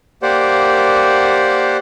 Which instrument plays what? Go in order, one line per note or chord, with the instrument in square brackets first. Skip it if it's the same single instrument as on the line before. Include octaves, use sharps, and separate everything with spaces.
[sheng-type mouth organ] A#3 G4 C5 D5 F#5